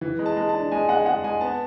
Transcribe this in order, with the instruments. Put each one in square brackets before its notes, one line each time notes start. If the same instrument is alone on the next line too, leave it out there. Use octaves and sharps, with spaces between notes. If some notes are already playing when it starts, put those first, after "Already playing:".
[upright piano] E3
G#3
[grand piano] A5
[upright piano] G#3
[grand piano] A5
[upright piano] D4
[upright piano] G#3 [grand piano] G#5
[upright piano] G#3 [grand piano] F#5
[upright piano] G#3 [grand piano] F#5
[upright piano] G#3 [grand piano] G#5
[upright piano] B3 [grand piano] A5